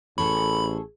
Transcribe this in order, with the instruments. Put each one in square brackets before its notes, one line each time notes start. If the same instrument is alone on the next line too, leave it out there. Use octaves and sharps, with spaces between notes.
[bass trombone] A1 [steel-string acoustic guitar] G#4 A4 C#5 [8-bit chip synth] B5